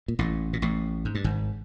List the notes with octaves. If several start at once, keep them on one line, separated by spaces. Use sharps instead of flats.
A#2
A1 A2
A#2
A1 A2
G#2
G2
G#1 G#2